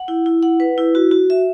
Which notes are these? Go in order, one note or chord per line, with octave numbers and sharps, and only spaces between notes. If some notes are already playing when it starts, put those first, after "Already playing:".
Already playing: F#5
E4
E4
F#5
B4
E4
F#4
F#4
E5